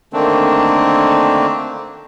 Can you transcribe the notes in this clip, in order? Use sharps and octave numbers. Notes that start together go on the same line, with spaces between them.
D3 D#3 A3 A#3 C4 D4